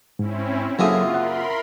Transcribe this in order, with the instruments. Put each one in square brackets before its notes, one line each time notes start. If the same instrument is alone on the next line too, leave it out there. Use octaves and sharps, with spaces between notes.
[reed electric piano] G#2 [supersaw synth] C4 C#4 E4
[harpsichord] F#2 C#3 A#3 [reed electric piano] F#3 A4 [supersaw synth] F4 [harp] E5 D#6
[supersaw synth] A#4 B5 C6 [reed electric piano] F#5